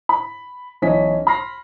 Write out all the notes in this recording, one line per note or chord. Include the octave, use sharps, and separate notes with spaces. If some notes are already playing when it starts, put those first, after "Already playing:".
B5
B1 E3 C#4 D#5 G#5 B6
B5 C6 F6 A#6 C7